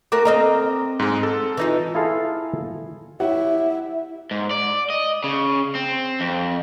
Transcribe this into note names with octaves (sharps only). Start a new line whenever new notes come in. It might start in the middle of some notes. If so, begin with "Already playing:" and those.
A3 F#4 A#4 D6
C4 D#5 F5 A#5
G#2 G#3
A4
E3 D#4 F4
E4 F4 G#4 A4 F5
E4 G4 C#5 E5 F#5
G#2
D5
D#5
C#3
C4
F2